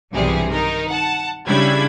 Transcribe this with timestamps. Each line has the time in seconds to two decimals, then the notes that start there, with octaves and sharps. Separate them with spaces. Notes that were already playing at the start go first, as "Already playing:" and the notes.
0.12 B1 G2 C3 E3 G3 G#4
0.51 D#3 D#4 A#4
0.89 F#5 A5
1.46 C#3 G3 D4 E4 B5 G#6